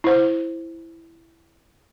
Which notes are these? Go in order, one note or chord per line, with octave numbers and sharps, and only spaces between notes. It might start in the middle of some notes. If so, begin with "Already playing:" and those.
E4 C5